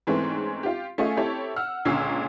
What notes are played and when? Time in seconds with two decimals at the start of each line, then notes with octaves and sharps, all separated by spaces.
0.07 G#2 E3 G#3 A3 C4 C#4
0.63 F4 G4
0.98 A3 C#4 F4 G#4 D#5
1.17 C4 E4 G4 A4 C#5
1.56 F#5 E6 F6
1.85 C#2 A#2 D3 C#4 E6 C7